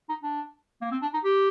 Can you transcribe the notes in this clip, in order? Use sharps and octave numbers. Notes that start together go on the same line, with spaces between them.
D#4
D4
A#3
C4
D4
D#4
G4